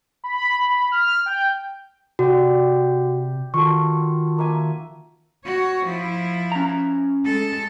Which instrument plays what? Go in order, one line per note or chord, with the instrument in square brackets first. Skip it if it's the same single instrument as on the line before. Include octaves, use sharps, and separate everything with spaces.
[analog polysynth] B5
F6
G5
[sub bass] C3 [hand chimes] F#4 [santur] G4 D5
[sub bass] D#3 [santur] F4 F#4 A4 [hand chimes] C#6
[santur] A#3 E5 G#5
[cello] F#4 C#5
F3 E4
[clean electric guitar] C#4 A#5
[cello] G#3 A4